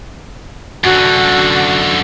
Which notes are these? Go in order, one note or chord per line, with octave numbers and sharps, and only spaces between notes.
F#2 D3 F#4